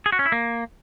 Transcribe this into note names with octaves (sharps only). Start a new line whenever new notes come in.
G#4
F#4
C#4
E4
A#3